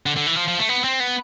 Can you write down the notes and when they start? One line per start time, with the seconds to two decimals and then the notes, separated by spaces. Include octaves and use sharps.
0.06 D3
0.16 D3
0.27 E3
0.37 F3
0.48 F3
0.59 A3
0.69 B3
0.84 C4
1.00 B3